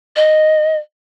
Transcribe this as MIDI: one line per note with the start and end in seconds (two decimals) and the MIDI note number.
0.16 0.77 75